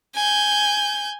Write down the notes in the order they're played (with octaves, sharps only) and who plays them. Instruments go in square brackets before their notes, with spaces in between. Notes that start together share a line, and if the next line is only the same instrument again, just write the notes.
[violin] G#5 G6